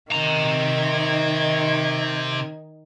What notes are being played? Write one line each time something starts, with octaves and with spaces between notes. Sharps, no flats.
C3 D#3 D#4 A#5 G#6